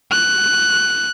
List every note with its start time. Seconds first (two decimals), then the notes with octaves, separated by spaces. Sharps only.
0.11 F#6